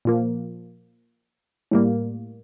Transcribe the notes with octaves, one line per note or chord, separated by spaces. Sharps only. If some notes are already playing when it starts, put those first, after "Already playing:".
A#2 F3 A#3
A2 G3 A#3